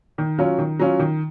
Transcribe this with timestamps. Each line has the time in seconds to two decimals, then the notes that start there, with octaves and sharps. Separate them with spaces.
0.18 D#3
0.38 F#3 C#4 F4
0.58 D#3
0.79 F#3 C#4 F4
0.99 D#3